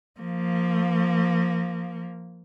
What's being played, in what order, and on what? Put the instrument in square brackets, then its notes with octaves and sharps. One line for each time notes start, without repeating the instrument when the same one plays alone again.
[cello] F3 A#3